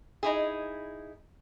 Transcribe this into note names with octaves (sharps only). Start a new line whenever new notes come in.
D#4 E4 G#4